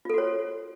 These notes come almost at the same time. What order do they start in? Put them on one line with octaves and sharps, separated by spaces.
F4 A4 F#4 C#5